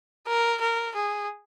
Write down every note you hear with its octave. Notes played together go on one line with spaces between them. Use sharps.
A#4
A#4
G#4